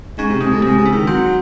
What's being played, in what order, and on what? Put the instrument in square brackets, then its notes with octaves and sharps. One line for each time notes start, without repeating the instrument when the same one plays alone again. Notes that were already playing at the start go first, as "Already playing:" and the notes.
[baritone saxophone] G#2 [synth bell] C#4
[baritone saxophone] C3
[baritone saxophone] C3 [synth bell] G#3
[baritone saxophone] A2
[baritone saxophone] C3 [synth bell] G#3
[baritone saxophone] C#3
[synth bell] E4
[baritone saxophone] D#3
[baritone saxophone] F#3 [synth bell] C4